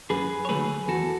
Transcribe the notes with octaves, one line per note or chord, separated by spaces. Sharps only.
F#2 G#4 B4
C#5
D3 F#3 A3 G#4 B4
E2 F#4 A4